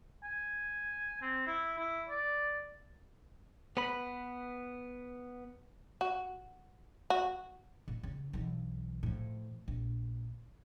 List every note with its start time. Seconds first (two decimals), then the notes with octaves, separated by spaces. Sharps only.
0.24 G#5
1.22 C4
1.47 E4
1.78 E4
2.09 D5
3.77 B3 B4 B5
6.01 F#4
7.10 F#4
7.88 A2
8.03 C#3
8.33 B1 E3
9.03 A2 F3
9.68 A#1